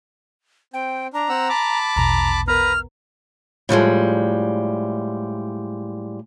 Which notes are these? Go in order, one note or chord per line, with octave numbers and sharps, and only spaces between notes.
C4 G5
D4 A#5
C4 F#5 E6
A5 B5 D6
A#1 E2 B2 A#5
B3 A#4 B4 A#5 F6
A2 F3 G3 G#3